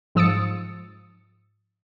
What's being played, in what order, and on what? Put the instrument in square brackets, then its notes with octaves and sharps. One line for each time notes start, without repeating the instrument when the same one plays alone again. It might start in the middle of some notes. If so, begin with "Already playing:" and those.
[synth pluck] G#2 F3 D#6 E6 A6 C#7